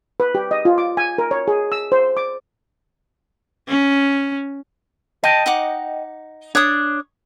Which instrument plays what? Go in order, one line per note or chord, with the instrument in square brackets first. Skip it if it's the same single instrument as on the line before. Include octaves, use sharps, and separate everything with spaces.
[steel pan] B4
G4
D#5
F4
D6
G#5
A#4
C#5
G#4
E6
C5
D6
[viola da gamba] C#4
[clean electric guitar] D#5 G5 [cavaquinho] A5
[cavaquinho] D#4 F#5 D6
[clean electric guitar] D4 [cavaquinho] C#5 D#6